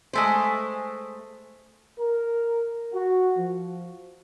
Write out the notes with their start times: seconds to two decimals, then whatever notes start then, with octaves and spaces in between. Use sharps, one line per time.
0.13 G#3 A3 C5
1.98 A#4
2.93 F#4
3.36 F3